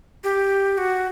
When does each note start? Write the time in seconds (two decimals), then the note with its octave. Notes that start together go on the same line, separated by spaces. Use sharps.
0.24 G4
0.78 F#4